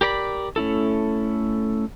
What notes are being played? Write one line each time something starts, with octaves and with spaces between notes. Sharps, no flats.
G4 A#4 D5 B5
A3 C#4 E4 A4